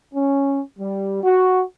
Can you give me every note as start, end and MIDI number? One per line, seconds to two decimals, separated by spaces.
0.14 0.59 61
0.79 1.21 55
1.23 1.62 66